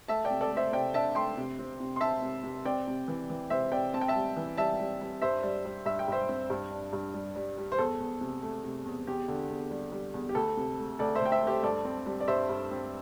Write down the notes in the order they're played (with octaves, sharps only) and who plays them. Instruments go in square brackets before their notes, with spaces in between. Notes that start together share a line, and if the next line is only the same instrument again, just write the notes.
[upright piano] A3 E5 A5
D5 G5
C3
A4 D5
A3
C5 E5
C3 D5 G5
D4 E5 A5
A3 G5 C6
C3
C4
C3
C6
C4 E5 A5
C3
C3
C4 D5 G5
C3
E3
E3
C3 C5 E5
C3 D5 G5
C4 A5
G5
E5 A5
G3
E3
G3 E5 A5
G3
G3
G2 C5 E5
G3
G3
G2 E5
G5
G2 C5 E5
C4
G2
D4
G2
G3
G3
G3
C5
E2 A4
E2
C3
A3
C3
E2
E2 G4
D3
E2
G3
G3
E2
G4
D2 A4
C3
A3
D2 A4 D5
C5 E5
D2 G5
C5 E5
A3
G4 C5
G2 A4 D5
C4
G3
D5
G2 C5 E5
G2
C4